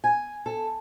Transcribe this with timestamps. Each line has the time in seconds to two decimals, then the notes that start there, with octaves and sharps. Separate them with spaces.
0.04 G#5
0.46 A4